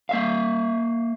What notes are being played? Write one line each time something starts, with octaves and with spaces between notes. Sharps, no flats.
A#3 E5 F5